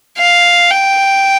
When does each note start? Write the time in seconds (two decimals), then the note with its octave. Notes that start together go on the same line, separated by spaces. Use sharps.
0.18 F5
0.71 G5